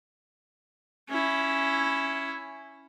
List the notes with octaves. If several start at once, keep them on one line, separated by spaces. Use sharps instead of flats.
C#4 E4